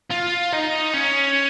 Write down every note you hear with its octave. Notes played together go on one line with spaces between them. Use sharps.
F4
D#4
C#4